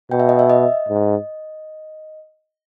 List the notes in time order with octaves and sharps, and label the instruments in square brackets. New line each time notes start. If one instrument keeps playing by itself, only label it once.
[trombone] B2 [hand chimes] G5
[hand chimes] E5
D#5
E5
D#5
[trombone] G#2